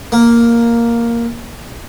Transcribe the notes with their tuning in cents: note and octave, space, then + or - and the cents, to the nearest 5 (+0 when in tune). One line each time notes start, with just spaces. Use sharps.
A#3 +0